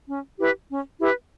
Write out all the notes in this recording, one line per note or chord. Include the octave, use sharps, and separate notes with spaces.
C#4
E4 G4 B4
C#4
E4 G4 B4